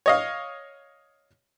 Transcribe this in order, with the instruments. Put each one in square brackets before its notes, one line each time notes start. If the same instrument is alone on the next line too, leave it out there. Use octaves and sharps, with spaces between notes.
[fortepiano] C#5 D#5 F5